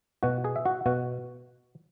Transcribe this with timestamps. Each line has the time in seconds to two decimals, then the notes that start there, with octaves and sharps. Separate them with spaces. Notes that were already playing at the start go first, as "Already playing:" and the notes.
0.23 B2 F#4 F#5
0.44 G#4 G#5
0.56 E5
0.65 F#4 F#5
0.86 B2 F#4 F#5